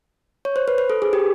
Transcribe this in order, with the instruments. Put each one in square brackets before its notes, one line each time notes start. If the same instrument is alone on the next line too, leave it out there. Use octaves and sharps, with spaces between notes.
[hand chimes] C#5
C5
B4
B4
A4
G#4
G4